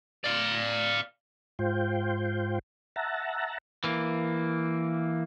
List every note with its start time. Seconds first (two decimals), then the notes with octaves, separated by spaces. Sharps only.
0.24 D5 F5
1.59 G#2 F4 C5 G5
2.96 E5 F#5 A5 A#5
3.84 E3 A#3